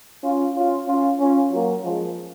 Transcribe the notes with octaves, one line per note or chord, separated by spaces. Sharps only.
C#4 F4
C#4 F4
C#4 F4
C#4 F4
F#3 A#3
F3 G#3